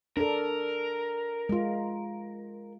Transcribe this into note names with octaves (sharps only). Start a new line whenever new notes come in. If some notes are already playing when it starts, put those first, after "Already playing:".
D4 A4 A#4
G#3 F4